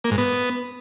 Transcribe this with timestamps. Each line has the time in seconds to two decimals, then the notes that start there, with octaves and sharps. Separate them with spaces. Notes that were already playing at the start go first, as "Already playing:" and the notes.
0.04 A#3
0.11 G#2
0.18 B3